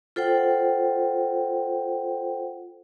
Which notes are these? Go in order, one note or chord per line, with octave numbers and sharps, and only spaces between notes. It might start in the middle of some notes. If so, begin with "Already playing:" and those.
F4 A4 C5 F#5 G5